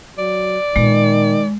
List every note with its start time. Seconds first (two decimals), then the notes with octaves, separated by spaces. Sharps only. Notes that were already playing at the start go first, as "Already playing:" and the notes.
0.18 F#3 D5
0.76 A#2 D#3 G#3 B3